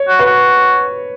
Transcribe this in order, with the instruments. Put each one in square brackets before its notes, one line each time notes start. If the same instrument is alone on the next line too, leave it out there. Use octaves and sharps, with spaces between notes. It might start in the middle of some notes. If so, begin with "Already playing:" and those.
Already playing: [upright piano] C#5
[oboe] F#4
[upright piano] B4
[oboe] F#4